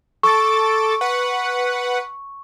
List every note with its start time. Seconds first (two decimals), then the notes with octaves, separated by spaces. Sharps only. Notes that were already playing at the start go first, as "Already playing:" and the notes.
0.23 A4 C#6 D6 A6
1.01 B4 F#5